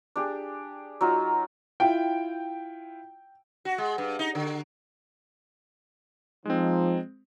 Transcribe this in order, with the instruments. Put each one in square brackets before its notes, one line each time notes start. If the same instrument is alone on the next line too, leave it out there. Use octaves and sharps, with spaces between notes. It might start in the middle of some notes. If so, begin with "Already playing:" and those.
[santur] D4 G4 G#4
F#3 D#4 F4
[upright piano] E4 F4 [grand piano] G5
[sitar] F#4
G#3
G2
D#4
D3
[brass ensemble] F3 D#4 [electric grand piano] G#3 C4